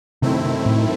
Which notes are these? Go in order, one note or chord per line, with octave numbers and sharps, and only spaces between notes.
F#2 C3 D#3 A3 C4 E4
A2